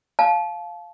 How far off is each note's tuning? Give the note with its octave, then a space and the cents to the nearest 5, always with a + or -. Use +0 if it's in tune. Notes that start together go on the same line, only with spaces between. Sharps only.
F5 +0 A5 -30